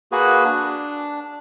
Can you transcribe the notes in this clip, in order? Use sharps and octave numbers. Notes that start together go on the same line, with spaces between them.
A#3 F#4 G#4 B4
D4